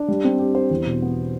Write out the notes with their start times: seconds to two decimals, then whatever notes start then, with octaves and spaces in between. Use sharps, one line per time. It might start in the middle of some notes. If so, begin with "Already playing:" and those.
Already playing: D4
0.08 G3
0.25 C4
0.39 G4
0.55 C5
0.70 E2
0.86 B2
1.02 B3